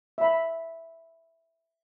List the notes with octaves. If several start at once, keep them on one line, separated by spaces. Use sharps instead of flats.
E5 B5